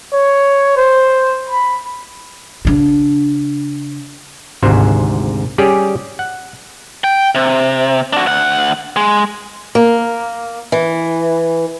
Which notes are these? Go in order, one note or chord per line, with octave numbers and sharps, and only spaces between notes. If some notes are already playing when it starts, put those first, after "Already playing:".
C#5
C5
B5
C#3 D4
G#1 D2 G#2 C3 C5 G#5
G3 C#4 G4 G#4 D5
F#5
G5
C3
D4 F#4
D2 F#5
G#3
A#3
E3